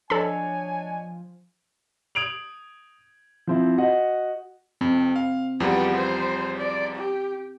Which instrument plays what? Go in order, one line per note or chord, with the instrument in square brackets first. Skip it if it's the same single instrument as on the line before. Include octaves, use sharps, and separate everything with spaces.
[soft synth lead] F3 [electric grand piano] D4 C#5 D#5 [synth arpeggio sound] A4 B5 [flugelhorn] G#5
[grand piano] D#6 G#6 D7 F7 F#7
F3 C4 E4
F#4 D#5 F#5
[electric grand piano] F2 [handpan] C4
[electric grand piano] F5
[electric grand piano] E2 F3 G3 [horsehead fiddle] B3 G4
[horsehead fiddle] C5
D5
G4